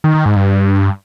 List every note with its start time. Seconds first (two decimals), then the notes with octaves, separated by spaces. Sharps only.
0.04 D#3
0.15 D#3
0.25 G#2
0.36 G2